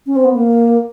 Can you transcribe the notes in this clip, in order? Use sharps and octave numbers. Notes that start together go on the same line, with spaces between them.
C#4
C4
B3
A#3